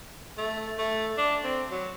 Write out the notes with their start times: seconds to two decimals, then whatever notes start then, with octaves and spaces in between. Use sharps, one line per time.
0.38 A3
0.78 A3
1.18 D4
1.44 C4
1.71 F#3